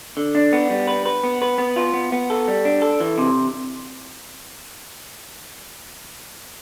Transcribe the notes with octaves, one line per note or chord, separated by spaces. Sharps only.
D3
D4
B3
G3
B4
B4
B3
B4
B3
F4
B3
B3
A4
G3
D4
A4
E3
C3